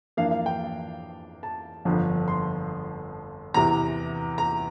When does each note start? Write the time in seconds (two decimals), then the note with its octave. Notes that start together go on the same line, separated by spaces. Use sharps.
0.17 F2 E3 A#3 D4 F5
0.31 F5
0.46 G5
1.43 A5
1.85 G1 F2 D3 F3
2.28 C6
3.54 E2 C3 E3 A#5
4.38 A#5